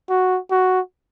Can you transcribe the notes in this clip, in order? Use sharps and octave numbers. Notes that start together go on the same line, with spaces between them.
F#4
F#4